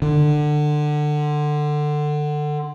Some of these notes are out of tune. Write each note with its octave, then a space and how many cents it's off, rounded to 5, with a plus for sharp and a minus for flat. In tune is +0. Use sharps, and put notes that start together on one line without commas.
D3 +25